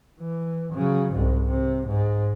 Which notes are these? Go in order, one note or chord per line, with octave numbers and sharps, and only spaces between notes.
E3
C#3 F#3
C2 G#2
C3
G#2